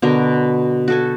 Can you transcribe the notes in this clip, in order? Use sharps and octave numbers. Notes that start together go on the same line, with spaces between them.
B2 D3 A#4
F#4 A4 G#5